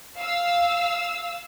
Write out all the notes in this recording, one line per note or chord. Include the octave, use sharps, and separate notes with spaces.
F5 E6